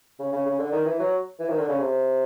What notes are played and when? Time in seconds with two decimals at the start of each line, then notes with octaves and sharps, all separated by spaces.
0.19 C#3
0.33 C#3
0.46 C#3
0.59 D3
0.72 D#3
0.86 E3
0.99 F#3
1.39 E3
1.49 D#3
1.59 D3
1.69 C#3
1.79 C3